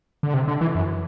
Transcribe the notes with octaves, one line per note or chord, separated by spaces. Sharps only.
D3
C3
D3
E3
F#2